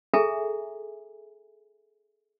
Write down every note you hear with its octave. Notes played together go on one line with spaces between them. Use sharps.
G#4 A4 E5 G#5 A#5